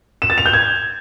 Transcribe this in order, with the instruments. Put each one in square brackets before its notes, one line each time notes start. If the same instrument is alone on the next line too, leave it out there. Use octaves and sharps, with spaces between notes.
[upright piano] E7
A6
F7
G6
G#6